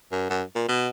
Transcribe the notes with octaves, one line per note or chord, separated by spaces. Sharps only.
F#2
F#2
A#2
B2